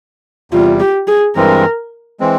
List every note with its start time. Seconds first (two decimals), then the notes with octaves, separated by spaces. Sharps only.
0.52 E2 C3 G3 F4
0.80 G4
1.07 G#4
1.36 G2 E3 G#3 C4 A#4
2.20 E3 G#3 C4